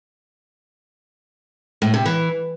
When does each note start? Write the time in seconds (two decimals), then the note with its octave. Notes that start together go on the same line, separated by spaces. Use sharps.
1.82 A2
1.94 C3
2.05 E3